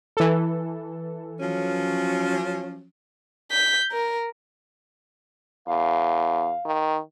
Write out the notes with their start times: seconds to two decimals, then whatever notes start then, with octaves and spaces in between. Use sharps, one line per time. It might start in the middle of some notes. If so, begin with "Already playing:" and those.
0.17 E3 A4
1.40 F3 F#3 C#4
3.52 G6 B6
3.91 A#4
5.68 E2 F5
6.65 D#3